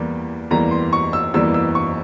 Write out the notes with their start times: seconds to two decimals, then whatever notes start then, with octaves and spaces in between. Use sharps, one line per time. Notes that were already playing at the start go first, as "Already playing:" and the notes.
Already playing: E2 E3 G3 A#3
0.51 E2 E3 G3 A#3 A#5
0.71 C6
0.93 C#6
1.13 E6
1.34 E2 E3 G3 A#3 E6
1.54 E6
1.75 C#6